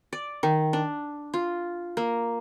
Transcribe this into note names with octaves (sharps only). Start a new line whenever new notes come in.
D5
D#3
D4
F4
A#3